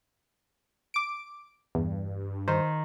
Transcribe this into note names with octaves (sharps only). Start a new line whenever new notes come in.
D6 D7
E2 G2
D#3 C5